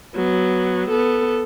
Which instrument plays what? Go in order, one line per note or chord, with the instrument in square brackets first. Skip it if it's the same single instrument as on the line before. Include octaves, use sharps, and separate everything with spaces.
[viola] F#3 B3
B3 A4